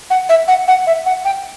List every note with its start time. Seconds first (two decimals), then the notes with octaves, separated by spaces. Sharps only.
0.10 F#5
0.29 E5
0.48 F#5
0.68 F#5
0.87 E5
1.06 F#5
1.25 G5